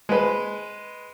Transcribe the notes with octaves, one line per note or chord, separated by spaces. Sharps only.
G#3 B4